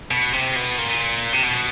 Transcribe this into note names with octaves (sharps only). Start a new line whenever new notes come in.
B2
C3
B2
A#2
C3
B2